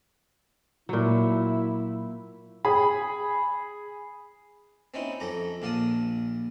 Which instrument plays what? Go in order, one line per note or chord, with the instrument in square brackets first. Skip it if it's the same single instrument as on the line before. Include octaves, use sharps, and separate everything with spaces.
[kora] A#2 F#3 [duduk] E4
[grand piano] G#4 B5
[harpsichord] C4 C#4 D#4 E4
F2 A4 A#5 D6
A#1 D4 F5 A5 D#6